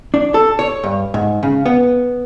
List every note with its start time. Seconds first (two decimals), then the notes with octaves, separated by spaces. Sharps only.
0.14 D4
0.34 A4
0.59 C#5
0.84 G2
1.14 G#2
1.43 C#3
1.66 B3